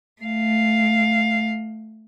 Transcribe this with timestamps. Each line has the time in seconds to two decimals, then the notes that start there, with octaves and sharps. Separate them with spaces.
0.22 A3 F5